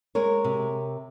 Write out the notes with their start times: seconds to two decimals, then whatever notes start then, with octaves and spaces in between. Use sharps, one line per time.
0.15 G#3 A#4 C#5
0.44 C3